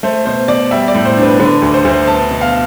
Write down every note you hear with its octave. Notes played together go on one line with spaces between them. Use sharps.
A3 C5
B2 C5
B2 D5
G3 E5
D5
A2
C5
D4
B4
D3 B4
D2
C5
D2
C5
B3 A5
B2
F5